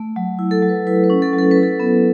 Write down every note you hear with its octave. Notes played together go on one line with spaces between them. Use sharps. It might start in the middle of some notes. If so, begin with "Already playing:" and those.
Already playing: A3
F#3
E4
A4
F#3
B4
E4 B4
B4
C#4
A4
F#3
A4
B4
E4
A4
B3